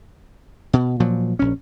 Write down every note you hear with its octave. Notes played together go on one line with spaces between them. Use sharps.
B2
A#2 F3 F#3
A#1 C#4